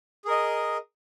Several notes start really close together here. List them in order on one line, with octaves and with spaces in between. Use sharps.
G#4 A#4 D#5